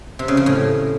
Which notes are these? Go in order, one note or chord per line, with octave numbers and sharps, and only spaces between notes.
C3
C#3
F3
A2